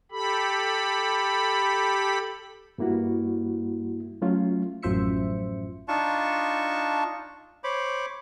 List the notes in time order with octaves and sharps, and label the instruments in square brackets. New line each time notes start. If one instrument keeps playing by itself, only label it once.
[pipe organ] G4 A4 B5
[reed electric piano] G2 G3 A#3 E4 F#4
F#3 A3 C#4 F4
[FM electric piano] A1 F#2 F3 C5 E5 C#7
[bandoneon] D4 D#4 F4 A5 C#6
C5 C#5 B5 D6